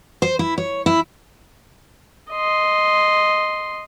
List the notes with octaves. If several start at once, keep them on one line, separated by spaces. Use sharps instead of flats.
C5
E4
C#5
E4
D#5 C6